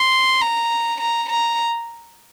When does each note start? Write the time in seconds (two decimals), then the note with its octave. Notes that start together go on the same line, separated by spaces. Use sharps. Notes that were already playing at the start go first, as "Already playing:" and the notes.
Already playing: C6
0.41 A#5
1.01 A#5
1.30 A#5